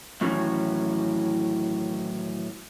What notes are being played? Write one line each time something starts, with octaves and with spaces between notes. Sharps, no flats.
A2 D#3 E3 F#3 C#4